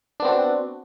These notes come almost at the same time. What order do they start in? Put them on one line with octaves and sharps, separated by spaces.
D4 B3 C4 F#4